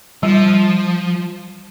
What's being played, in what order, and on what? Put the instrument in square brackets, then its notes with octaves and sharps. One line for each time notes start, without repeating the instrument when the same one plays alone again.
[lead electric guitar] F3 [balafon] G3